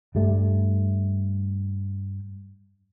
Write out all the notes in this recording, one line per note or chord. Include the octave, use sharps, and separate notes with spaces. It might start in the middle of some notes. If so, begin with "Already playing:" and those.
G2 G3 A3